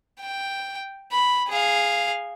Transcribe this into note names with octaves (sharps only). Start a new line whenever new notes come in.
G5
B5
G#4 F5